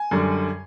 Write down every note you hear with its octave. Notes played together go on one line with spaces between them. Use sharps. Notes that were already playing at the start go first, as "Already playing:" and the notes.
Already playing: G#5
F#2 D3 G3